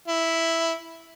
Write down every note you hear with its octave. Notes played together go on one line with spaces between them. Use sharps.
E4